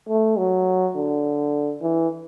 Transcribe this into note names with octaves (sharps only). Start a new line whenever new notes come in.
A3
F#3
D3
E3